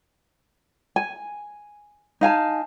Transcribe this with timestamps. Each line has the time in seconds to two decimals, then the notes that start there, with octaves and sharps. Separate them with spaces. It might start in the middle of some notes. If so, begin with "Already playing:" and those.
0.96 G#5
2.21 D#4 F5 G#5 A5